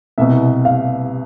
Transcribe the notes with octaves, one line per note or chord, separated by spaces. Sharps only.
C2 B2 E5
F5